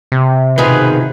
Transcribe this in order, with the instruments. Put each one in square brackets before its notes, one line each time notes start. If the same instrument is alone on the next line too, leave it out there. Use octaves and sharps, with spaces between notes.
[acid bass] C3
[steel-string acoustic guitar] G#2 B2 F3 [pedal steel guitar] D#3 G#4 [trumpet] B4